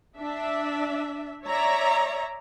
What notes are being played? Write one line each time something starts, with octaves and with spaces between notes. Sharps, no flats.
D4 E5
C#5 D5 E5 A#5